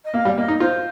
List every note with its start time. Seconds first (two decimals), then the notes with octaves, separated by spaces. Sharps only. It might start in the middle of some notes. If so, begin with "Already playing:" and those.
0.04 D#5
0.14 A#3 F5
0.25 G3
0.37 A#3 D#5
0.48 D#4
0.60 F4 C5